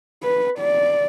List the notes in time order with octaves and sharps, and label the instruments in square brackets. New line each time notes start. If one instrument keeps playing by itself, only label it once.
[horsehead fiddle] B4
D5